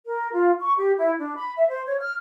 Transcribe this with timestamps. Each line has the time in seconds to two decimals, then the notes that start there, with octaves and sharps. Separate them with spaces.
0.07 A#4
0.32 F4
0.60 C#6
0.77 G4
0.98 E4
1.18 D4
1.35 B5
1.57 E5
1.68 C5
1.86 C#5
2.01 F6